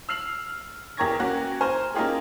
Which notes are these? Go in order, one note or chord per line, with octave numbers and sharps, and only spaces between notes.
E6 F6 C7 F7 F#7
E2 G4 A#4 C#6 G#6 A#6
A#3 C#4 F#4 G4
C5 G#5 A#5 C6 C#6 F6
A#3 C#4 D#4 F4 G4 G#4